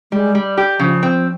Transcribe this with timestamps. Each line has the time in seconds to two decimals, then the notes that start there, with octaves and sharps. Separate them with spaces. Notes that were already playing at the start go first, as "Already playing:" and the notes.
0.12 G3 G#3
0.35 G3
0.57 G4
0.79 C#3 F3
1.03 C4